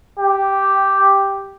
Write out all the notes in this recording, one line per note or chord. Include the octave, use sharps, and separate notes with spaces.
G4